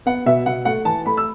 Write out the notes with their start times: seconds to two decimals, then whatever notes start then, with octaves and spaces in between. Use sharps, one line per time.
0.06 B3 F#5
0.26 B2 E5
0.46 B2 F#5
0.65 A3 F#5
0.85 E3 A5
1.06 A3 B5
1.17 E6